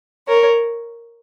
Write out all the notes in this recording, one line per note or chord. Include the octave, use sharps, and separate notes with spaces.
A#4 C#5